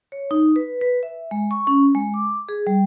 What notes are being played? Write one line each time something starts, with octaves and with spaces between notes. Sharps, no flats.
C#5
D#4
B4
B4
E5
G#3
C#6
C#4
G#3
D6
G#4
G3